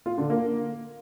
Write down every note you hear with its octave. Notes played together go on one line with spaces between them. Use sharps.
F4
D3
A#3